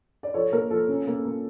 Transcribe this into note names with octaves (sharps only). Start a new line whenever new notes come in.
D5
F3 A4 C#5
A#3 A#4
F3 A4
C#4
A#3
A#3